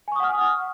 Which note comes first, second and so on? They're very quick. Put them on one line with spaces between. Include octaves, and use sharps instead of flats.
G#5 C#6 D#6 F#5 F6